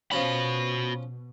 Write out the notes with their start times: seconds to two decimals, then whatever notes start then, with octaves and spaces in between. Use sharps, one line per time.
0.12 B2 F3 C#4 F#4 B5